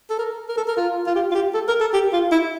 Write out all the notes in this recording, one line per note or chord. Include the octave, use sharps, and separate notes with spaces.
A4
A#4
A#4
A4
A#4
F4
F4
G4
F4
G4
A4
A#4
A4
G4
F4
E4